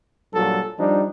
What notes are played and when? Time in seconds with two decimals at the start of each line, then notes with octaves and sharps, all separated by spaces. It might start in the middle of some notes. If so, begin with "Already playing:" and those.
0.33 G2 A#2 F#3 A4
0.79 F3 G3 D4 D#4